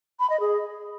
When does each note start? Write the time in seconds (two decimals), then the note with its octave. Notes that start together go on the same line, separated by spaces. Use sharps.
0.20 B5
0.30 D#5
0.40 G#4